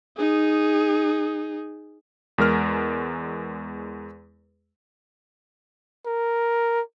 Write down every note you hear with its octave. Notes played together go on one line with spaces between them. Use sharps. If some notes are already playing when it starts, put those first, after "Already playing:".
D#4 G#4
E2 G#3 A#4 F6
A#4